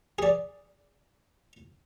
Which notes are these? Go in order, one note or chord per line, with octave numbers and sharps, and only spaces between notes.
G#4 D5